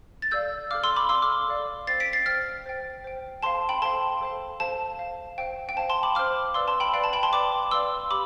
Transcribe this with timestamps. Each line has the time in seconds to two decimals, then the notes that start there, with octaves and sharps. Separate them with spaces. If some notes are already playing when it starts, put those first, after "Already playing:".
0.22 A6
0.31 A4 D5 F5 E6 G6
0.71 A4 D5 F5 D6 F6
0.84 C6 E6
0.96 B5 D6
1.09 A4 D5 F5 C6 E6
1.22 D6 F6
1.48 A4 D5 F5
1.87 C5 G5 A6 C7
2.00 B6 D7
2.13 A6 C7
2.26 C5 G5 F6 A6
2.66 C5 G5
3.04 C5 G5
3.43 A4 C5 F5 A5 C6
3.69 G5 B5
3.82 A4 C5 F5 A5 C6
4.21 A4 C5 F5
4.60 A4 C5 F5 A5
4.99 C5 F5
5.38 C5 F5 G5
5.69 G5
5.77 C5 F5 A5
5.90 A5 C6
6.03 B5 D6
6.15 C5 F5 D6 F6
6.54 B4 D5 F5 C6 E6
6.67 A5 C6
6.80 G5 B5
6.93 B4 D5 F5 G5 B5
7.04 A5
7.13 G5 B5
7.23 A5 C6
7.33 B4 D5 F5 B5 D6
7.71 B4 D5 F5 C6 E6
8.10 G4 B5 D6